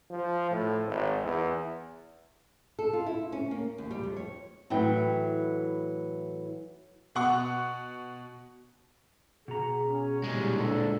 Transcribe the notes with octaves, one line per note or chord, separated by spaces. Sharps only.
F3
A2
G#1
E2
A4
F4
E4
C#4
A#3
D#2
G3
F2
C#5
A2 E3 F#3 G5
B2 F#5 C#6
B2 F#4 G#4 A#5
C#4
A#2 G3 G#3
D2 D4 A4